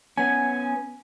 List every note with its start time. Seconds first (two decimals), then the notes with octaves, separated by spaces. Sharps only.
0.17 B3 C#4 G#5